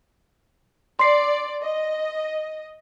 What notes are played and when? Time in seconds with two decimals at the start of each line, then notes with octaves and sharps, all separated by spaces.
0.99 D5 C6 C7
1.62 D#5